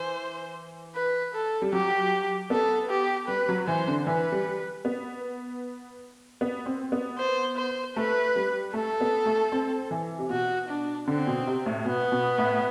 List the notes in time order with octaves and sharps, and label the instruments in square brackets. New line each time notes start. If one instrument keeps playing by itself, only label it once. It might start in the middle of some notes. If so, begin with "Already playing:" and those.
Already playing: [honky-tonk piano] E3 [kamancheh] C5
[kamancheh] B4
A4
[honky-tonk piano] G3
[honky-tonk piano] F#3 [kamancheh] G4
[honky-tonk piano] B3 [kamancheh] A4
[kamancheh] G4
[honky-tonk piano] G3 [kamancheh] B4
[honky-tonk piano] F#3
[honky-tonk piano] E3 [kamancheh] C5
[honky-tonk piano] D3
[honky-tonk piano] E3 [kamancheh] B4
[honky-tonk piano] G3
B3
B3
C4
B3
[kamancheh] C5
C5
[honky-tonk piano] A3 [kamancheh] B4
[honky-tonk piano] G3
[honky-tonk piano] A3 [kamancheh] A4
[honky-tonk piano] B3
A3
C4
E3
C3
[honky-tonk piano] B2 [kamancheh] F#4
[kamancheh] D4
[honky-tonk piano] D3 [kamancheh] C4
[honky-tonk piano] B2
C3
A2
[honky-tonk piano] B2 [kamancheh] B3
[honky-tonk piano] B2
A2